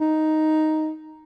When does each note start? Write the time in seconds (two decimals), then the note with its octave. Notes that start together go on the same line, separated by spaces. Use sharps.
0.01 D#4